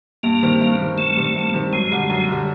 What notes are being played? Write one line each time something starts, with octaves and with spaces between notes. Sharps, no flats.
G2 A#3
D#3 G3 C4
G2
D#3 G3 C4
G2 A3
D#3 G3 C4
G2
D#3 G3 C4
F#2 G#3
D3 G3
F#2
D3 G3